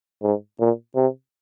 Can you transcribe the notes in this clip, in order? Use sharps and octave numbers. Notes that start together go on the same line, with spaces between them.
G#2
A#2
C3